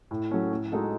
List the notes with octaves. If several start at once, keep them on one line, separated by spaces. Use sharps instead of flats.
A2
F#3 A3 C#4
A2
G#3 D#4 F#4 A4